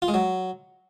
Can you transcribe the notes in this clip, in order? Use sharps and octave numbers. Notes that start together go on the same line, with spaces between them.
F4
G#3
F#3